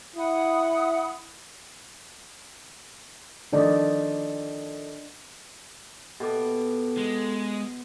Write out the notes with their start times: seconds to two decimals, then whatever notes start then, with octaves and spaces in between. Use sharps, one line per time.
0.16 E4 F#5 B5 D#6
3.53 D#3 F3 A3 D4 D5 D#5
6.20 B2 G4 A4 D6
6.97 G#3